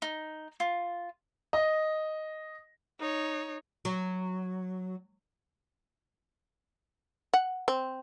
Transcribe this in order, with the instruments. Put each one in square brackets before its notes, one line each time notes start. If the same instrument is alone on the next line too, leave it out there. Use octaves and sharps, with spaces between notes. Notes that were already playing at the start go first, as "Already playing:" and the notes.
[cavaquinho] D#4
F4
[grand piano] D#5
[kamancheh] D#4 C#5
[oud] F#3
[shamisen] F#5
C4